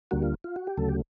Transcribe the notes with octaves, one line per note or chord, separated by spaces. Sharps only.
D2 D3 G3 A#3 F#4
F4
F4
F#4
G4
D2 C#3 F#3 A3 A4
G4